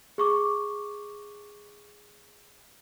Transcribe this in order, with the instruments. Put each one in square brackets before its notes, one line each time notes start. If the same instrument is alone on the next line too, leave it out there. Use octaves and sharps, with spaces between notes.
[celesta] G#4 C#6 D6